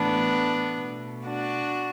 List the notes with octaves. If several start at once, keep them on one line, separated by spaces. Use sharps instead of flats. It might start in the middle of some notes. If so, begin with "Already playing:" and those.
Already playing: A2 E3 A3 B3 D4
B2 A3
D4 F#4